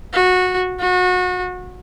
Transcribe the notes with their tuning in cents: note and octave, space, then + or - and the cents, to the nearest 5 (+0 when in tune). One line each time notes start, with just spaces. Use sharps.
F#4 -15
F#4 -30